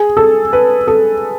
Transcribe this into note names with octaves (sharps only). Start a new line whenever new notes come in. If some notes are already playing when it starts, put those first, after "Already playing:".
Already playing: G#4
A4
B4
A4